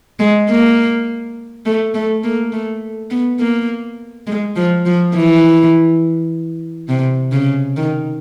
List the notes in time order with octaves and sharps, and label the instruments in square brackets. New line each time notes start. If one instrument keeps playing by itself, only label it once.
[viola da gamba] G#3
A#3
A3
A3
A#3
A3
B3
A#3
G#3
F3
F3
E3
C3
C#3
D#3